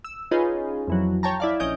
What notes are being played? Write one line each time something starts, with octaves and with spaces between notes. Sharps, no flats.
E6
C#4 D#4 F4 G#4 B4
F2 E3 F#3
C#5 G5 A5 A#5
E4 D5 F5
A#1 C#4 D#5 G6 D7